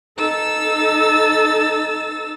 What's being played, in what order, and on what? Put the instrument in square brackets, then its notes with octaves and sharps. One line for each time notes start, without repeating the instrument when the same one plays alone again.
[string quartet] D#4 A4 E6 A6